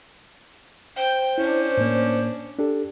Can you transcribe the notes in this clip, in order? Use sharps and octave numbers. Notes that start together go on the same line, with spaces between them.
C5 G5
C#4 D4 E4
A2 A#3
D4 G4 A4